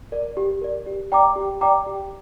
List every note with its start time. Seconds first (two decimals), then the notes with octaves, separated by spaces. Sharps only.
0.12 A#4 D5
0.37 G4
0.61 A#4 D5
0.87 G4
1.12 D5 G5 A#5 D6
1.36 G4
1.61 D5 G5 A#5 D6
1.87 G4